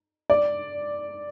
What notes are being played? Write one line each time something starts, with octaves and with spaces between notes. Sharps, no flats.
D5